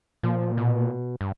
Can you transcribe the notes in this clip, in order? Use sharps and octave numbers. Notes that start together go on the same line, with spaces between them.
A#2 F3
B2
G2